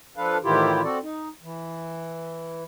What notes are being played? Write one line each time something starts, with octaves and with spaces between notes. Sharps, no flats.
F3 D4 A4 B4 F5
A2 D#3 E3 E4 F4 G4
C4 F#4 A4 D5
D#4
E3